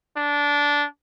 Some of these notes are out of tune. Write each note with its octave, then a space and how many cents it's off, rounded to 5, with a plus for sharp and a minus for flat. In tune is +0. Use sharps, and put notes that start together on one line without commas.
D4 -15